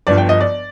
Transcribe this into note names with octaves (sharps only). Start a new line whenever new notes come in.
G1 G2 F3 D5
G5
D#5
D5